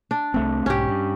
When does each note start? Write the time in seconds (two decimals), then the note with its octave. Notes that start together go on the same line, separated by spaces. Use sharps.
0.11 D4
0.34 C2 A3 C4
0.66 B1 G#2 C#4 G4
0.88 G2